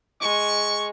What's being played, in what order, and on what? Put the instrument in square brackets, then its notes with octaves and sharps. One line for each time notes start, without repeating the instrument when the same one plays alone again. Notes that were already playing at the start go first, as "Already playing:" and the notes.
[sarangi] G#3 [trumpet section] C#6